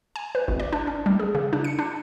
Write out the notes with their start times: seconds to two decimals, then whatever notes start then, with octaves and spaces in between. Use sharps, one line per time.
0.16 G#5
0.35 B4
0.48 G#1
0.60 D5
0.73 D4
0.87 C#4
1.06 G3
1.19 G#4
1.35 C#3
1.53 D4
1.64 C#7
1.79 D4